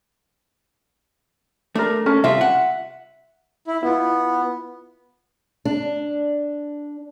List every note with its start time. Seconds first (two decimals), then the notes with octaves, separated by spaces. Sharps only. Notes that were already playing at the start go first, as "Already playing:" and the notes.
1.75 A3 D4 A#4
2.06 C#4 A4 A#4
2.24 C3 G3 F4 E5
2.41 F#5
3.68 E4
3.83 B3 E4 F4
5.65 D4